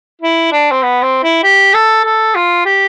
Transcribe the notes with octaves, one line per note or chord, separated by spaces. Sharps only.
E4
D4
C4
B3
C4
E4
G4
A4
A4
F4
G4